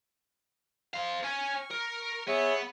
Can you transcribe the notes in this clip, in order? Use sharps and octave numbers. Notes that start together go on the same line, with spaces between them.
C4 F5
C#5 G#5 C#6 F6
A#4
B3 G#4 C#5 E5